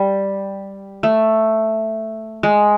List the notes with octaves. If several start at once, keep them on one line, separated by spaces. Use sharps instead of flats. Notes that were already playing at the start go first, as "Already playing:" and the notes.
Already playing: G3
A3
G#3